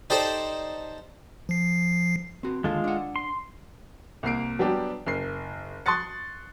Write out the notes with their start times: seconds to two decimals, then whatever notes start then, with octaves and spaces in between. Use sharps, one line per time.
0.10 D#4 G4 A4 C5 D5
1.49 F3 C7
2.43 C4 F#4
2.64 D#2 D3 G#3 F4 A4
2.84 D4 F#5
3.16 C6
4.23 C2 A#3 C7 D7
4.59 F#3 G3 B3 D4 G4
5.06 F#1 C7
5.86 C6 C#6 D#6 F#6 A6 C#7